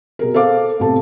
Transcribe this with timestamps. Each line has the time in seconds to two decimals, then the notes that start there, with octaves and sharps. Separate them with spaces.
0.19 B2 G#4 A#4
0.34 A4 C5 F5 D6
0.80 A2 C3 B3 A4 A5